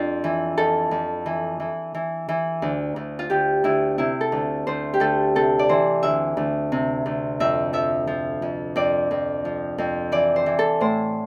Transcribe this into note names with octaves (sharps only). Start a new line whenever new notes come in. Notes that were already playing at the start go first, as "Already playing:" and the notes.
Already playing: F2 D4 F4
E3
F2 A4
F2
E3
E3
E3
E3
D2
D2
F4
D2 G4
D2 E4
C3 E4
A4
D2
D2 C5
G4
D2 A4
C3 A4
D5
E3 C5
D2 E5
D2
C3
D2
F2 E5
F3 E5
F3
F2
F2 D5
F2
F3
F2
E3 D5
C5
E3
A4
A2 C5